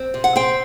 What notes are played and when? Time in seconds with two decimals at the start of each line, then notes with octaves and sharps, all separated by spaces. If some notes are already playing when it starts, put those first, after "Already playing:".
Already playing: C4
0.14 C3
0.24 F#5
0.36 C4 G5